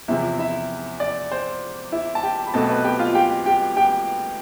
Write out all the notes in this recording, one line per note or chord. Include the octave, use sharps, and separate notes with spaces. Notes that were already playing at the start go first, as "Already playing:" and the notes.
E2 C3 F3 E4 E5
E4 E5
D5
C5
E4 E5
A5
G4 G5
B5
B1 B2 A3 C4 A4 A5
B4 B5
G4 G5
F4 F5
G4 G5
G4 G5
G4 G5